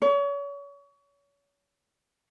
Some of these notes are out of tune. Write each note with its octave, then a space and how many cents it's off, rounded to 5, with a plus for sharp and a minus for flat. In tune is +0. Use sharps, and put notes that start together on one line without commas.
C#5 +35